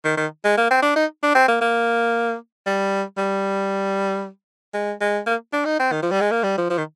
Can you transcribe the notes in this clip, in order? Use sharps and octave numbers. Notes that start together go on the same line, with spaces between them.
D#3
D#3
G#3
A#3
C4
D4
D#4
D4
C4
A#3
A#3
G3
G3
G#3
G#3
A#3
D4
D#4
C4
D#3
F3
G3
G#3
A#3
G3
F3
F3
D#3